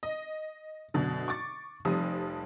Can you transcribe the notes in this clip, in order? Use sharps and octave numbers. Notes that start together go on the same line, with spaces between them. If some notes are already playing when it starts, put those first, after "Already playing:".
D#5
F#2 B2 D3
C#6 D6 A6
F1 F2 G3 D#6